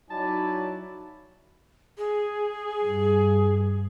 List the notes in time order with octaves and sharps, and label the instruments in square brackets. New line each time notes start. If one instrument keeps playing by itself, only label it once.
[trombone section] F#3 [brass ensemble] D#4 E4 [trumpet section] D5 G#5 B5 [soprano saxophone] A5
[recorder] G#4
[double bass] G2